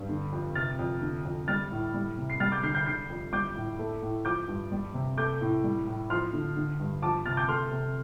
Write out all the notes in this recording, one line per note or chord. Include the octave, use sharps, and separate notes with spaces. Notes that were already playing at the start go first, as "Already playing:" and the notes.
Already playing: G2 G3
D3
F2
C3 F6 A6
F2
D3
F2
G3 F6 A6
A2
G3
C3
C7
G3 F6 A6
D6 G6
D3 G6 C7
G6 C7
D3 G6 C7
F2
G3 D6 G6
A2
A3
A2
F3 D6 G6
G2
G3
C3
A3 D6 G6
A2
G3
A2
F3 C6 F6
D3
D3
G2
F3 A5 D6
C3 F6 A6
D6 G6
A3 C6 F6
C3